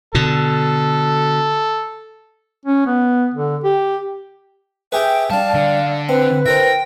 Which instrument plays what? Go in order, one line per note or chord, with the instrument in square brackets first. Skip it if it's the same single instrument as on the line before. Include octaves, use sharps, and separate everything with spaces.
[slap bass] B2 D3 [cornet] A4
[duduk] C#4
B3
D3
G4
[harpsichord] G4 G#4 B4 [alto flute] E5 [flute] G5
[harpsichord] G3 D4 [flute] D5 [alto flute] F5 [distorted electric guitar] A5
[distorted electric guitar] D3
[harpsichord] C4 [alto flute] B4
[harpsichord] E4 A#4 C5 [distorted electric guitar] G5 [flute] A#6